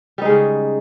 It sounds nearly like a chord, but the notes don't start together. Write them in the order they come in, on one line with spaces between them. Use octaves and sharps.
G3 D#4 G#3 C#3